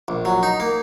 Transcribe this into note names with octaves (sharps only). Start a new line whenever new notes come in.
A#1
F#3
D#4
A#3